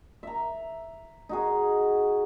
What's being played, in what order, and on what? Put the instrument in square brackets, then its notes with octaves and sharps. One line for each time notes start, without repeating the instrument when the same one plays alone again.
[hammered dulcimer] E5 A#5
D#4 F#4 G#4